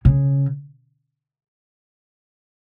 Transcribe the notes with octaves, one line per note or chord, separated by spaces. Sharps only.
C#3